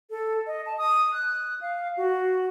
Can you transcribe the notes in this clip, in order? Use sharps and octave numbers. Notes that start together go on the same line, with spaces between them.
A4
D#5
A5
D#6
F#6
F5
F#4